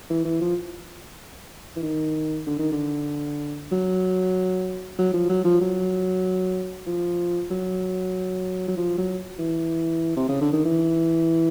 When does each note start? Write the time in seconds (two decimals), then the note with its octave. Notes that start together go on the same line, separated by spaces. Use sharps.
0.10 E3
0.25 E3
0.41 F3
1.76 E3
1.83 D#3
2.47 D3
2.59 D#3
2.72 D3
3.72 F#3
4.98 F#3
5.13 F3
5.30 F#3
5.45 F3
5.61 F#3
6.87 F3
7.51 F#3
8.68 F#3
8.77 F3
8.98 F#3
9.39 E3
10.17 C3
10.29 C#3
10.41 D3
10.53 D#3
10.65 E3